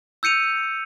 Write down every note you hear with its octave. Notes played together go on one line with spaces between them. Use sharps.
E6 G6 C#7 D#7 F7